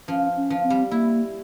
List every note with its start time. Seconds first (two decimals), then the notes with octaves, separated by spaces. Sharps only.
0.08 F3 C#4
0.36 C#4
0.50 F3
0.64 C4
0.70 G3
0.91 A#3 E4